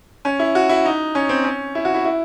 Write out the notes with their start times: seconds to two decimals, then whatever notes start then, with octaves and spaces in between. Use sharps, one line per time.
0.25 C#4
0.39 E4
0.55 F#4
0.69 E4
0.85 D#4
1.15 C#4
1.29 C4
1.44 C#4
1.75 E4
1.85 F#4
1.94 E4
2.05 E4